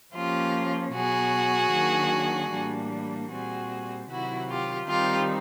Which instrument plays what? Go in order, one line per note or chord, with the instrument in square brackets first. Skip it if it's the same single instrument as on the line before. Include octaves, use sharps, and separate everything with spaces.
[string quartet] F3 A#3 C#4 F4 G4
B2 F#3 B3 F#4 G#4
D#3 F#3 A#3 D4
A2 E3 G3 A#3 D4
A#2 G3 C4 F#4 G#4
C3 D#3 F#3 E4 F#4
F4 G4
D#3 G3 C4 D#4 F4 G4